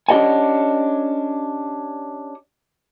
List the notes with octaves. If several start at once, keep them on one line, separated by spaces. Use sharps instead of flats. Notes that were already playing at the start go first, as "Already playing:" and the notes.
C#4 D4 G4 D#5 F#5 G#5